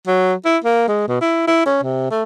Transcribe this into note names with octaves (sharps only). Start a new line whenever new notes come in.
F#3
E4
A#3
G#3
B2
E4
E4
C#4
C3
A3